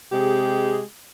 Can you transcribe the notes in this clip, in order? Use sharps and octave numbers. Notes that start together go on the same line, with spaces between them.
C3 G#3 G4 G#4